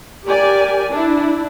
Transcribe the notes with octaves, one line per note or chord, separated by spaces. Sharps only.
G4 A#4 D5 G#5
D4 E4